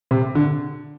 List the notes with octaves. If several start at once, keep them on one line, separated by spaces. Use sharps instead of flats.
C3
D3